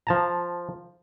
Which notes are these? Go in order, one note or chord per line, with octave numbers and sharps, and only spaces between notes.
F3 A5 A#5